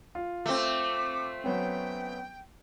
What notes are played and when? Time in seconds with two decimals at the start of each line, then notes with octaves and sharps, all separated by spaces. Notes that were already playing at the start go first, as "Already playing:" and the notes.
0.15 F4
0.46 A3 C4 D6
1.44 F#3 B3 C#4 G5